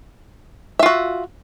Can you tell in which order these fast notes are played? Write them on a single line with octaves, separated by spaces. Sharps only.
E5 F4 F#4